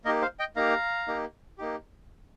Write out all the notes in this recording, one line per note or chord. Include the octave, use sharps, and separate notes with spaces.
A#3 D#4 G4 A#4 D#5
C5 F5
D#5 G5
A#3 D#4 G4 F5 A#5
A#3 D#4 G4
A#3 D#4 G4